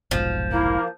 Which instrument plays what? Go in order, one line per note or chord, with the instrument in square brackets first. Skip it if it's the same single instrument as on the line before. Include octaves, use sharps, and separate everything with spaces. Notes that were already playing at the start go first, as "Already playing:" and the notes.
[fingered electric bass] F1 B1 G#2 [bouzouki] F3
[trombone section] A#3 [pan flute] E4